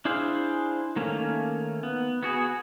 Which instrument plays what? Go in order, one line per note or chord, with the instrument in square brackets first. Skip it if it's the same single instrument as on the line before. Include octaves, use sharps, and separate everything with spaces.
[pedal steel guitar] D4 E4 G#4 C5 F5
D#3 A3 A#3 C#4
B3
B3 F#4 G#4